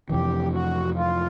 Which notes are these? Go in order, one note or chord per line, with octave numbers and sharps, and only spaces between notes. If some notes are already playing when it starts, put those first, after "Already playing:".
F2 C3 E3 G4
F#4
F4